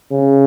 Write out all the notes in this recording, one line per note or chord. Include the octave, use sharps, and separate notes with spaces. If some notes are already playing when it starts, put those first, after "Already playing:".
C#3